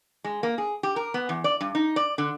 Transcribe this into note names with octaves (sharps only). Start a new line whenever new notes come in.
G#3
A#3
G#4
G4
A#4
B3
E2
D5
G2
D#4
D5
D3